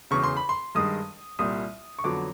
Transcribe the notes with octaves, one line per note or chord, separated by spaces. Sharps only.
E1 E2 C#3 C#6
C6
B5
C6
G2 D#3 G#3 D#6
C2 A#2 G3 D#6
C#6
F2 D3 F#3 B3 D6